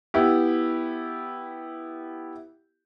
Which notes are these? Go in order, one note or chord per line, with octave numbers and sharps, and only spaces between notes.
B3 E4 G4